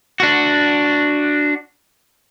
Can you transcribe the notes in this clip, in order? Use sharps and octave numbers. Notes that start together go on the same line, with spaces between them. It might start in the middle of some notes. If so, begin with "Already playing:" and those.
D4 F#4